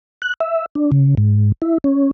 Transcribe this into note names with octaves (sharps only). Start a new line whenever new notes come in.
F#6
E5
D4
C#3
G#2
E4
C#4